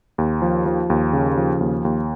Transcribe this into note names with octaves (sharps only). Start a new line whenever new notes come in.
D#2
F3
F3
D#2
C#3
F3
D#2
D#2